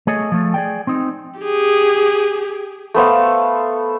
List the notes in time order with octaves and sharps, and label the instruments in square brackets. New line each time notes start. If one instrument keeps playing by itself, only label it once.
[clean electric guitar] A3 G#4 C#5 D#5
F3 A3
G#4 D5 G5
C4 D#4
[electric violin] G4 G#4
[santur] A3 B3 C5 F5